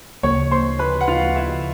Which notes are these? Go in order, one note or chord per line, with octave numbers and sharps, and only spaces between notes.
D2 C#3 F3 A#3 C#5 C#6
C5 C6
B4 B5
F#5
F4 F5
E4 E5